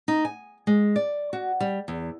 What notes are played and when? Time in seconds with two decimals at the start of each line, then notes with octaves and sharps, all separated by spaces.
0.08 D#4
0.25 G#5
0.67 G#3
0.96 D5
1.33 F#4
1.60 G3
1.88 E2